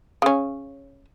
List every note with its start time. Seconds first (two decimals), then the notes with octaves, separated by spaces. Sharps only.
0.22 C#3 C#4